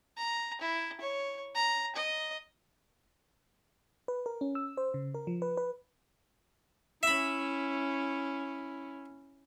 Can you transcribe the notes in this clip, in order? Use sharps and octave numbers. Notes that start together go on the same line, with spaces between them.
A#5
E4
C#5
A#5
D#5
B4
A#4
C#4
E6
C5
C#3
A#4
F3
B4
B4
C#4 E4 E5 B5